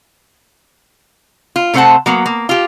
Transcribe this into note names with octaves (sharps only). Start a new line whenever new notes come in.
F4
C3 A3 C4 C5 F#5 A5
F#3 A#3 B3
A#3
F4 G4